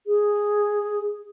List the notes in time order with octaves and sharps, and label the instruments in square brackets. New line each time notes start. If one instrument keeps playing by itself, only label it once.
[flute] G#4